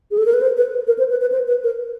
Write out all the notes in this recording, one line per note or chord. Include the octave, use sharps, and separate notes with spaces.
G#4
A4
A#4
B4
C5
B4
A#4
C5
B4
B4
C5
B4
A#4